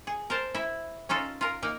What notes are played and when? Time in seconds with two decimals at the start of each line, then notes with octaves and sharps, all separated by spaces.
0.07 G#4
0.30 A#4 C5 A5
0.55 E4 E5
1.09 C#4 D#4 F4 A4
1.41 F4 A#4
1.63 A#3 D#4 A#4